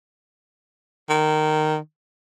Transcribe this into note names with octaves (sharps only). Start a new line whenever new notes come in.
D#3